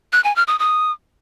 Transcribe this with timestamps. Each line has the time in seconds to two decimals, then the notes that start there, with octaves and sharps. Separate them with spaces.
0.13 F#6
0.24 G#5
0.36 F6
0.47 D#6
0.59 D#6